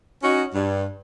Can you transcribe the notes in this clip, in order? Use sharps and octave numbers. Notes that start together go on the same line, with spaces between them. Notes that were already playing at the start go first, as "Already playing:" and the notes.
C#4 D#4 F#4
G2